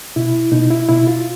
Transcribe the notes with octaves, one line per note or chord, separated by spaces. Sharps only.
B2 E4
B2 D#4
E4
B2 E4
F4